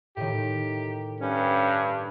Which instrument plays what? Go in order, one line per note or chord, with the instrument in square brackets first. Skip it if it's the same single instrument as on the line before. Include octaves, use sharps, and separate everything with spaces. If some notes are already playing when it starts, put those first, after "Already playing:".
[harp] A2 D#3 [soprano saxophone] G4
[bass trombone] G2 [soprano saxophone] C#4